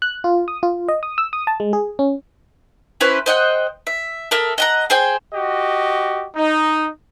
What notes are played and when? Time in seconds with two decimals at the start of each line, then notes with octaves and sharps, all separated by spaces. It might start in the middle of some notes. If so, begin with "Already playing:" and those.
0.02 F#6
0.24 F4
0.48 D#6
0.63 F4
0.88 D#5
1.03 D#6
1.18 E6
1.33 D#6
1.47 A5
1.60 G#3
1.73 G#4
1.99 C#4
3.01 C#4 E4 B4 C5
3.26 C5 D#5 F#5 G5
3.87 E5
4.31 A4 A#4 E5 D#6
4.58 D#5 F#5 A#5
4.90 G#4 C5 G5
5.33 F#4 G4 D#5
6.36 D#4